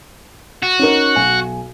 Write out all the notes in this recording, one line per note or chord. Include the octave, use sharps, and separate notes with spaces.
F#4
C#4 D#4 A#4
B1 G#5